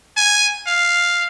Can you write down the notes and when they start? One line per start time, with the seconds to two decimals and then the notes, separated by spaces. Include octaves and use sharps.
0.17 G#5
0.67 F5